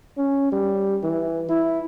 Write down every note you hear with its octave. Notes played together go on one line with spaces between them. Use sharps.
C#4
G3
E3
E4